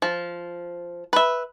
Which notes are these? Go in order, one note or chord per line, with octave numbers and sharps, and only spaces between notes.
F3
B4 E5